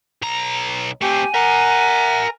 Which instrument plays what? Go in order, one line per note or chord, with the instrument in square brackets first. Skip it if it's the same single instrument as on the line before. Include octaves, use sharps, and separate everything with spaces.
[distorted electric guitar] B1 A#5
[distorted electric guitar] A3 C4 [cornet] G4 [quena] G#5
[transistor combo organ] A#4 [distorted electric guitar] E5 A#5 [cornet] F#5